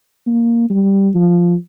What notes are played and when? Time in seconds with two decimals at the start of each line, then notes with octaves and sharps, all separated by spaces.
0.27 A#3
0.70 G3
1.15 F3